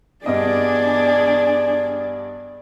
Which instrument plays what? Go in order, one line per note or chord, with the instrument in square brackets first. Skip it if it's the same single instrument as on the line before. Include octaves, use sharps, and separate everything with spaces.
[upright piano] G2 B3 D#5 [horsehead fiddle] D4 G#4 [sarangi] D5